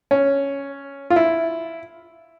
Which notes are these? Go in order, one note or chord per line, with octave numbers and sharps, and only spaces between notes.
C#4
F4
E4